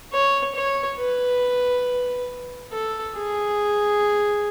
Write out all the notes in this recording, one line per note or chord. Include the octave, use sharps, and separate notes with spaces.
C#5
C#5
B4
A4
G#4